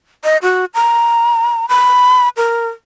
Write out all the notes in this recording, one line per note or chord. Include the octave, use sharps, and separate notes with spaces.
D#5
F#4
A#5
B5
A#4